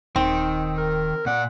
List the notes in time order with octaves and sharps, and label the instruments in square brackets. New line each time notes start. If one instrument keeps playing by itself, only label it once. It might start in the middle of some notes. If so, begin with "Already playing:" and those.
[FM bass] D#1 [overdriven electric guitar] D#3 [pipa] C4
[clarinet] A#4
[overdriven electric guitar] A#2 D5 [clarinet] F#5